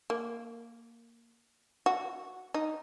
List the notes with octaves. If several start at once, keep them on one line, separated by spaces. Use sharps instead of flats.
A#3
F#4
D#4